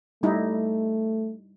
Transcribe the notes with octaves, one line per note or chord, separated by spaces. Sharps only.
G3 A3 D#4 E4